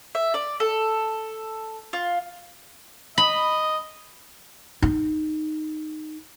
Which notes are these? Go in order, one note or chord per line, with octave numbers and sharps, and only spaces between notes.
E5
D5
A4
F4
D#5 B5
D#4